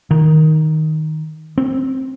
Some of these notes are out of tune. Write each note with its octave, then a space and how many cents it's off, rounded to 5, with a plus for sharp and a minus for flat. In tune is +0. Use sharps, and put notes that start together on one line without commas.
D#3 +5
C4 +15